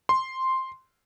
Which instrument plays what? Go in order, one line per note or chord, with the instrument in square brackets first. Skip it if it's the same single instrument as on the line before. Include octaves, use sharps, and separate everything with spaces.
[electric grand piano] C6